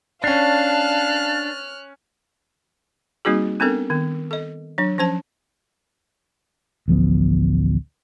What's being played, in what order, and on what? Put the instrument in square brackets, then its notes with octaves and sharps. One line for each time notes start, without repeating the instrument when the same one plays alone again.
[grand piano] C#4 C7 [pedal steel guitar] D4 [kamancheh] F5 A5 [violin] F6 F#6
[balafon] G3 A#3 C4 D#4 F#4 G#4
B3 C4 D4 A4 A#4
D#3 B3
A4 D#5
F#3 D4
F3 C#4 C5 A5
[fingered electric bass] A1 D2 F3 B3